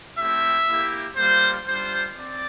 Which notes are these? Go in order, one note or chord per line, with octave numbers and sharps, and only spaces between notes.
A3 C4 E4 G4 E5
A#3 E4 G4
G3 A#3 F4 C5
G3 D4 F4 C5
C4 D5